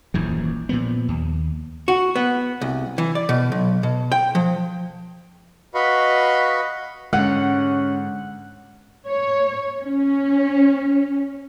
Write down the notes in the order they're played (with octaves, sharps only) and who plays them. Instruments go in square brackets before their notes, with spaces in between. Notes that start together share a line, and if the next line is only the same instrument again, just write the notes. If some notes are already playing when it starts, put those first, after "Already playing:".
[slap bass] D#1 A#1 F#2 E3
A#2 F3 B3
D#2
[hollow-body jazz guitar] F#4
B3
C2
E3
D5
B2
B1
B2
G5
F3
[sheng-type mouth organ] F#4 B4 D#5 F5 B5 C#6
[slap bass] G#2 D3 [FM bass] G#3 [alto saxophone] C#4 [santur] F#5
[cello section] C#5
C#4